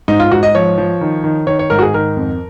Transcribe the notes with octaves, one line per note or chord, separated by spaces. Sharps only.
G#2 D#4
F4
G#2 F#4
D#5
F3 C#5
F3
D#3
D#3
D#3 C#5
C#5
G#2 A#4
F#4
G#4
D#3 A#4
F2